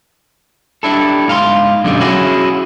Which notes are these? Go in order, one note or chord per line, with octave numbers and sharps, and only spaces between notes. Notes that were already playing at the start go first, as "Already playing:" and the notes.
G3 D4 E4 A4
G#2 F5 A#5 C6
F#2 B2 D3 E3 G3 G#3
C#4 E4 F#4 G#4